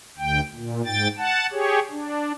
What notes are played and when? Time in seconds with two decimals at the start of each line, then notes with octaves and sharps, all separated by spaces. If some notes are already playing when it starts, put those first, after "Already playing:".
0.18 D2 G5
0.54 A#2
0.85 G#2 G5 A6
1.18 F#5 A5
1.52 G4 G#4 C#5
1.91 D4